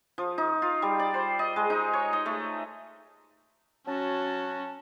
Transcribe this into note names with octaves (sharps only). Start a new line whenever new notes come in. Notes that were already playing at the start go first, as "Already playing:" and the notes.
F3
D#4
F4
G3
D5
C5
D#5
G#3
D#4
C#5
D#5
A3
F#3 C#4 F#4 A5